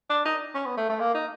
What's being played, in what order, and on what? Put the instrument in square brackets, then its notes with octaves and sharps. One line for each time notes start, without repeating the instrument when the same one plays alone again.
[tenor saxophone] D4
D#4
C#4
B3
A3
A3
A#3
D#4